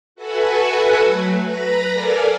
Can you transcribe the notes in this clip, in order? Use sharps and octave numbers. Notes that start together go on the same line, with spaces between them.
F#4 A4 B4 E5 F#5 G#5
F#3 A3
B4 A#5 B5 A#6
A4 A#4 D5 F5 G#5